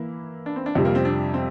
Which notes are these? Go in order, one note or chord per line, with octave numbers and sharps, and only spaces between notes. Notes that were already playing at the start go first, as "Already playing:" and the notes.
Already playing: E3 A#3 E4
D4
C4
D4
F2 C3 G3 C4
A#3
C4
D4
C4